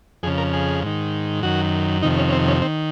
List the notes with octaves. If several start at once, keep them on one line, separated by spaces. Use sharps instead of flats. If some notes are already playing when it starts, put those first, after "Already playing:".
F2 C#3 G#4
A#4
G#4
G#2 D#3
F#2 D#3 F#4
F2 C3 D#3 D#4
C#4
C#4
C4
C#4
D#3 C4